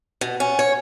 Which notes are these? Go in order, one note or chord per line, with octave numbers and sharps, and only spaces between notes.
B2
C#4
C#5